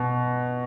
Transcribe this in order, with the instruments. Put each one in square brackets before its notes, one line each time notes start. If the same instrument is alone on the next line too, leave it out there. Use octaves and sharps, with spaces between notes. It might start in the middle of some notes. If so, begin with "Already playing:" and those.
Already playing: [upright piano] B2